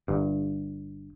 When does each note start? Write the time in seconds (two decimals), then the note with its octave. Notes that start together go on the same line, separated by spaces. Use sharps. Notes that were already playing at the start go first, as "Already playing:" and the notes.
0.08 G1 G2